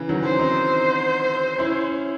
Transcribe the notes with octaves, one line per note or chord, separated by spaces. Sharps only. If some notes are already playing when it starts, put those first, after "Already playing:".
Already playing: C#3 E3
D#3 F#3
C5
C4 D#4
C#4 E4